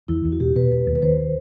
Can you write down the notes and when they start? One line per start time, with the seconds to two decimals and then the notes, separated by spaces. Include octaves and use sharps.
0.08 E2 E4
0.24 E2
0.32 F#4
0.40 B2 G4
0.56 B2 B4
0.71 E1 B4
0.87 D#2
0.95 B4
1.02 D#3 C5